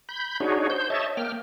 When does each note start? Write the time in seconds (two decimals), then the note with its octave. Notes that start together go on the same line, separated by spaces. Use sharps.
0.09 B5 G6
0.40 D4 D#4 F#4 G#4 C#5
0.70 C5 G6
0.90 C#5 D#5 E5 A5
1.17 A#3 G5 F6